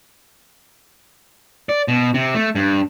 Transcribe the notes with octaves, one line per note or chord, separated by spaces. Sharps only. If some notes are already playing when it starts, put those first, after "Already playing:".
D5
B2
C3
A3
G2